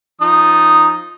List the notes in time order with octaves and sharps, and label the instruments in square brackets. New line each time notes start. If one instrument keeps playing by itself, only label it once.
[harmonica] F3 D#4 D#6